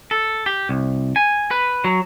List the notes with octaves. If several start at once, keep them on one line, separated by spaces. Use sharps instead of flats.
A4
G4
C2
G#5
B4
F#3